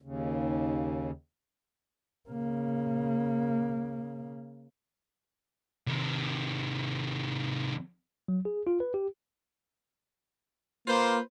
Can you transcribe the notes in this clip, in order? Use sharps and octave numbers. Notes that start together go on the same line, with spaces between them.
D#2 C#3
C#3 A#3
C3 D#3
F#3
G#4
F4
B4
G4
A#3 F4 B4 C5